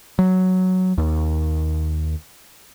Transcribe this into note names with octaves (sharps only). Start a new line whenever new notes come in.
F#3
D#2